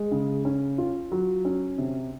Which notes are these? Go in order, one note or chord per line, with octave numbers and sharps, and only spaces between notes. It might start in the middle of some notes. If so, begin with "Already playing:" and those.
Already playing: G#3
C#3
C#4
F4
F#3
C#4
C3